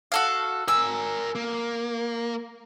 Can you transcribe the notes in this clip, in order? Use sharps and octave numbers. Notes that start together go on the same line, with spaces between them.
F#4 A4 F5
A#4 G#5 E6
A#3